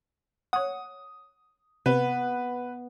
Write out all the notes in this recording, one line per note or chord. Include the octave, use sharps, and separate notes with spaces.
C#5 F#5 D#6
C3 B3 B4